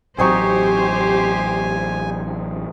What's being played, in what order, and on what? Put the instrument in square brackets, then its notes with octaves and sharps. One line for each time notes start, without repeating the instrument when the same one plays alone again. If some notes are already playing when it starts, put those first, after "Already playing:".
[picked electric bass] A1 F#3 [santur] C4 D#4 C#6 [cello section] G4 C5 [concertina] G#5